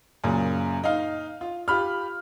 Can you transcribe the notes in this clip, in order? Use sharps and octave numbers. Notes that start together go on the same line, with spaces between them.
F#2 A#2 C#3
D#4 F5
F4
F4 G4 B5 F6